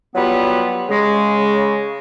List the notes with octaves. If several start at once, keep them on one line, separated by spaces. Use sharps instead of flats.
F#3 G3 B3 F4 B4
C#3 G#3